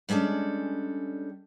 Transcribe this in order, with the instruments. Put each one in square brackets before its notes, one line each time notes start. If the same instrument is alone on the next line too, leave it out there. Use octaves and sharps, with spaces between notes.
[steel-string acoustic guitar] G3 G#3 C#4 D4 A4